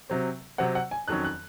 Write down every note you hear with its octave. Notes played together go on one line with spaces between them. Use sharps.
C3 F#3 C4
C3 F#3 C4 F#5
F#5
G#5
F2 D#3 F#3 C#4 F#6
F#6